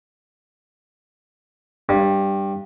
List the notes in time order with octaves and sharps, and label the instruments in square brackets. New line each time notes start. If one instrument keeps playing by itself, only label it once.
[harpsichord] G2